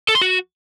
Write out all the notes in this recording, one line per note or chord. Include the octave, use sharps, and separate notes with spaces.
A4
C6
F#4